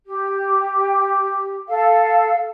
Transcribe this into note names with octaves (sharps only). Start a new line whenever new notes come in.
G4
A4 F5